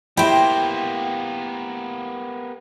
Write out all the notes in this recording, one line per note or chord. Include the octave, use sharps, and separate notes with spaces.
A#3 B3 E4 G4 C5 E5 G5 B5